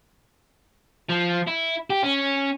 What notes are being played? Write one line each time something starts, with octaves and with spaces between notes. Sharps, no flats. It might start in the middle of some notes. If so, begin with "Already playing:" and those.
F3
E4
G4
C#4